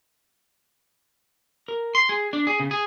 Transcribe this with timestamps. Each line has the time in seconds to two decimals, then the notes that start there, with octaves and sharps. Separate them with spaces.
1.68 A#4
1.95 C6
2.09 G#4
2.33 D4
2.47 G#4
2.60 C#3
2.71 G#4